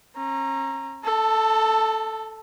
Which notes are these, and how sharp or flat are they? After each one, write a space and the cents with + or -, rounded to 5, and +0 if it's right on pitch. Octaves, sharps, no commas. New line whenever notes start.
C#4 -40 A#5 +0
A4 +0 A5 +30